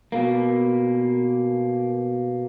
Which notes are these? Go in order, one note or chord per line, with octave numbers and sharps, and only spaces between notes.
B2 A#3